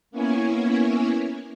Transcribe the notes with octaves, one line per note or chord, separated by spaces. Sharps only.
A#3 B3 C#4 E4 C#5 G#5